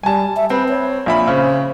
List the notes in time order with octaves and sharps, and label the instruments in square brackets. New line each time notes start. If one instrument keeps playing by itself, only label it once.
[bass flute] G3 [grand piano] G#5 A5
[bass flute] E5
[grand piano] C4 [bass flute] B4
[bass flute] C#5
[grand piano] A#1 E5 B5
[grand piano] C#3 [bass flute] C5